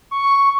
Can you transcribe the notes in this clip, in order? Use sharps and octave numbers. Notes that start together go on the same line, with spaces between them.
C#6